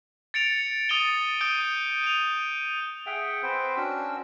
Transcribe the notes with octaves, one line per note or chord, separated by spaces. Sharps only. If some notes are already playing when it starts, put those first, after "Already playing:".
A6 C#7 D7 F7
D#6 A6 D#7 F7 G7
D#6 G6 D7 D#7
D#7 F7
G#4 E5 F#5 G5
C4 B4 C5 G5
C#4 D4 F#4 E6